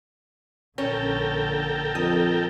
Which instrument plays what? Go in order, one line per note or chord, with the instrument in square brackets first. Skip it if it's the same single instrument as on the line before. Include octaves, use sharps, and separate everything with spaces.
[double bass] A#1 D3 [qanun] C#4 [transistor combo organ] A4 A#4 G5
[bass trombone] F2 [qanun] D#5